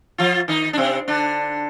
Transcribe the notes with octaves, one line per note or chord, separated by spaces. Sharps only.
F3 F4
D#3 D#4
D4
C3 C4
D3 D4